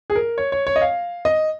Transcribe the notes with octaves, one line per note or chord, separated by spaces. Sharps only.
G#4
A#4
C#5
C#5
C#5
D#5
F5
D#5